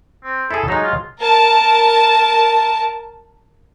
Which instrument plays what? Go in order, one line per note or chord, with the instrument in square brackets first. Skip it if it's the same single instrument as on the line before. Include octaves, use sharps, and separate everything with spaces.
[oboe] C4
[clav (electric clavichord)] E4 G#4 [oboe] A4
[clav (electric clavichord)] F#3 G#3 [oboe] D#4
[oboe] F4
[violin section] A#4 A5